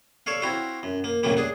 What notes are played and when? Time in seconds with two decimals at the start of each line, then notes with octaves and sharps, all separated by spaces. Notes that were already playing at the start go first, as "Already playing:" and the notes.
0.26 A4 C#5 D5 F5
0.42 C4 E4 F#4 F5
0.83 F#2
1.04 A#3
1.23 C2 F2 A2 C#3 F#3 A#3
1.37 D4 G#4